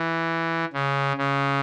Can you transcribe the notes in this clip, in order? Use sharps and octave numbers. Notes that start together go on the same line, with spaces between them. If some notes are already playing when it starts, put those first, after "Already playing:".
Already playing: E3
C#3
C#3